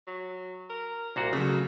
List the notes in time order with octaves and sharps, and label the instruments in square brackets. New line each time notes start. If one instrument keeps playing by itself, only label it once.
[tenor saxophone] F#3
A#4
[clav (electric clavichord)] C2 A#2 F#4 [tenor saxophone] A#3
[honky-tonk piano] C#3 F#3 [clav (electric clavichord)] A3